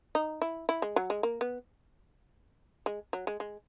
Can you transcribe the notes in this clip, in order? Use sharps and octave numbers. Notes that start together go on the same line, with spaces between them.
D#4
E4
E4
G#3
F#3
G#3
A#3
B3
G#3
F#3
G#3
G#3